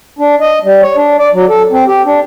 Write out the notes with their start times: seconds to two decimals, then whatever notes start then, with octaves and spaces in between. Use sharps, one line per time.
0.19 D4
0.41 D#5
0.64 G3
0.82 C#5
0.97 D4
1.19 D5
1.34 F#3
1.49 A4
1.72 C4
1.88 G4
2.06 D4